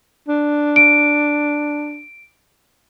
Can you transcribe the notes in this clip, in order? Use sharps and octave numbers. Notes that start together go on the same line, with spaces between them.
D4
D7